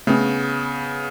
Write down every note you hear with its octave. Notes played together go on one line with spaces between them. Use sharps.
C#3 A3 B3 C4